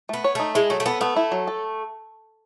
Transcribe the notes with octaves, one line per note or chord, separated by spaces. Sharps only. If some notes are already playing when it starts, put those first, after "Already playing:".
A3 B3
C#5
A3 D#4
G#3 E4
F#3 A3
A3
B3 A4
A3 B3
E4
F#3
A4